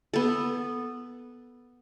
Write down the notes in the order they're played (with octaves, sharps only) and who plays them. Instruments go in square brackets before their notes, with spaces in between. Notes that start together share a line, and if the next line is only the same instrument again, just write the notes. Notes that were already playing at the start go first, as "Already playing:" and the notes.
[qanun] B3 A4